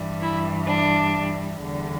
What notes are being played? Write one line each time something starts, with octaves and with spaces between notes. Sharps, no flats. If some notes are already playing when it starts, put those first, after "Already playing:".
Already playing: G2 E3 G3
E4
D4
E2 D3 G3